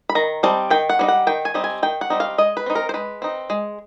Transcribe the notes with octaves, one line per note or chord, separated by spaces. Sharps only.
B5
D#3 A#5
G3 C4 D#4 A5
D#3 G5
F#5
G3 C4 D#4
F#5
D#3 G5
G#5
G3 C4 D#4
G#5
D#3 G5
F#5
G3 C4 D#4
F5
G#3 D#5
B4
C4 D#4
A#4
C5
G#3 B4
C4 D#4
G#3